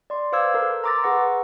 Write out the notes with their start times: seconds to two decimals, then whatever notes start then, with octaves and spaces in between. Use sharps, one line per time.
0.10 D5 C6
0.32 B4 C5 F5 D6 E6 G#6
0.54 A4 A#4
0.84 A#5 C6 D6 E6 A6 A#6
1.03 G#4 B4 F#5 C#6